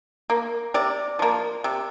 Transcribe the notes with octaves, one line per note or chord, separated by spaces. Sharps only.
A#3
C3 D5
F3 A#3
C3